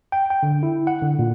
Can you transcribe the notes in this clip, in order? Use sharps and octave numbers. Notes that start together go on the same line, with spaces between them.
G5
G5
D3
E4
F#5
D3
A#2